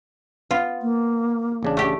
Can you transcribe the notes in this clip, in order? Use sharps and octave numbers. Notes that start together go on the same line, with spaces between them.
B3 F4
A#3
A1 C#3 D4
A3 G4